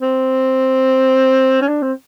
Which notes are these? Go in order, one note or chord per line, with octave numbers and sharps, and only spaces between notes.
C4
C#4
D4
C4